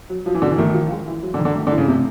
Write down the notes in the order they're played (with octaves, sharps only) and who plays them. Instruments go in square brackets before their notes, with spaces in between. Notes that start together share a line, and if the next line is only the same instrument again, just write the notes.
[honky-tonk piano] F#3
[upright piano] F3 [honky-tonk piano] F#3
[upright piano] E3
[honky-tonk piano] B2 [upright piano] D3
[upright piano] E3
[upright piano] D#3 [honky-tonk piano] A3
[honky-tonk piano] F3
G#3
E3
F#3
[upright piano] D3
[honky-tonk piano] D#3
[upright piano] D3
[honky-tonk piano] A3
[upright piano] D3
[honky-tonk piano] E3
[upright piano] C#3
[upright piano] C3 [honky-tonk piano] A3